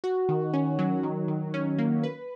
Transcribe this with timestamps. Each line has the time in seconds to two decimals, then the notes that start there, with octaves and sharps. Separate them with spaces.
0.04 F#4
0.29 D#3
0.54 C#4
0.79 F#3
1.03 D#3
1.28 D#3
1.54 C#4
1.79 A#3
2.03 B4